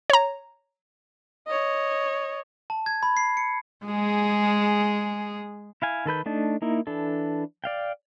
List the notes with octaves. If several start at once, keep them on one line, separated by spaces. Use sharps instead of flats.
C#5 A#5
C#5 D#5
A5
G#6
B5
C7
C#7
G#3 G#4
E4 F5 G#5
D#3 A4 B4 G6
A3 D4 D#4 A5
A#3 D#4 E4
E3 D4 A4
D5 F5 G5